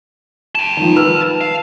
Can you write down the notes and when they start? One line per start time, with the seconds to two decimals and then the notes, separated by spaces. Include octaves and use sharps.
0.55 G5 A5
0.77 D#3 F3
0.96 B4 E6 F6
1.41 F5